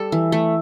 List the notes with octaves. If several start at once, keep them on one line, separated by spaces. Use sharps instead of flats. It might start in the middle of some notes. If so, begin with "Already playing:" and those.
Already playing: G3 A4
E3
A3